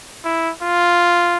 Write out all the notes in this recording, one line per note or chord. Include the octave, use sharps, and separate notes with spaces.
E4
F4